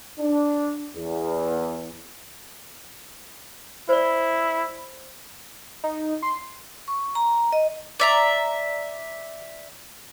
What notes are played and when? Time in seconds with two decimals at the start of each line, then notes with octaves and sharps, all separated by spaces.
0.20 D4
0.97 E2
3.89 E4 C5 D5
5.84 D#4
6.22 C6
6.88 C#6
7.15 A#5
7.52 D#5
8.00 D5 E5 A#5